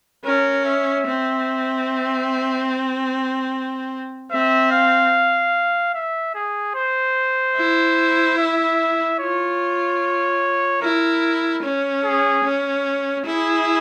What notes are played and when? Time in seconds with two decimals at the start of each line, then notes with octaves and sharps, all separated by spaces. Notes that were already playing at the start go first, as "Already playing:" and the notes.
0.25 C#4 A#4
0.65 E5
1.07 C4
4.31 C4 E5
4.72 F5
5.94 E5
6.35 G#4
6.75 C5
7.56 E4
8.38 E5
9.19 F4 C#5
10.82 E4 A#4
11.63 C#4
12.04 G#4
12.44 C#4
13.26 E4 G#4